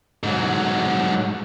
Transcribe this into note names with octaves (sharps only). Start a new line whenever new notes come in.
G#2 F#3